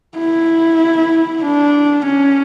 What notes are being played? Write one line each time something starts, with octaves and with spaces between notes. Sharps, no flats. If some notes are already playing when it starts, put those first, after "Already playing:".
E4
D4
C#4